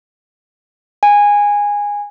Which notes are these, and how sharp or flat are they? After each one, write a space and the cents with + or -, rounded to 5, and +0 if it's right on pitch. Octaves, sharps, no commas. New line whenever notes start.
G#5 -15